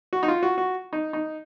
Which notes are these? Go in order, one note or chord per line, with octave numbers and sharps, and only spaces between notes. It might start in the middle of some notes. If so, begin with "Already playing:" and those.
F#4
D#4
F4
F#4
F#4
D#4
D#4